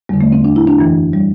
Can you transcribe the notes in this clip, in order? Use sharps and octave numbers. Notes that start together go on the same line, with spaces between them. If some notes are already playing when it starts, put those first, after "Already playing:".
E2 D3 G3
A3
C4
D4
E4
D4
F#2 E3
G3